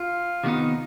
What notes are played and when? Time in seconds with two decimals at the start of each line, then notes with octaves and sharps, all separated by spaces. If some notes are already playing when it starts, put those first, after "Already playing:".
Already playing: F4
0.43 C3 D#3 F#3 B3 D#4